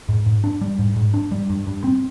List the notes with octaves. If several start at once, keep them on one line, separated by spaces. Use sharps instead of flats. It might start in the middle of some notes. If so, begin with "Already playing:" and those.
G#2
G#2
D4
G3
G#2
G#2
D4
G3
G2
G2
C4